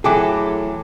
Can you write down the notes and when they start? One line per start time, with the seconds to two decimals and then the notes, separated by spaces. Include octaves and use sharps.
0.04 A2 E3 F#3 G#4 A4 G5 D6